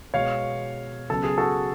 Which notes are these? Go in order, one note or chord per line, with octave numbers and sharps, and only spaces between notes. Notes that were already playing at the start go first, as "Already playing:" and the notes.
B2 G#3 B3 C#5 F5
C#3 F#3 B3 A4
G#4
F#4 A4